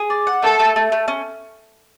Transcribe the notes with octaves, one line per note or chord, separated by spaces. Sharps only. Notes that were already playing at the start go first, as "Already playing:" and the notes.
Already playing: G#4
D5
F#5
A3 A4
A3
A3
A3
C#4